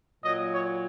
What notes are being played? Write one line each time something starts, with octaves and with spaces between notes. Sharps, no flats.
A#2 F#3 D#5
C#5